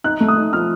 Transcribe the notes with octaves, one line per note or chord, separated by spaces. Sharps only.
D#4 F#6
A3
D#6
D#4
F3 F6